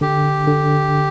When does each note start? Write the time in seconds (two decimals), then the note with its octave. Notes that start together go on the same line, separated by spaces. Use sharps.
0.01 D3 G4
0.47 D3